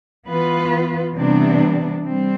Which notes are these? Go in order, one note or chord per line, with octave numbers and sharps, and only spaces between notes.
E3 B3 F4 B4
C3 E3 G3 B3 D4
G3 C4